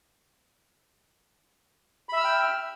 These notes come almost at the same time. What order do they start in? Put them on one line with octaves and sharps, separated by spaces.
B5 E5 E6 F6 G5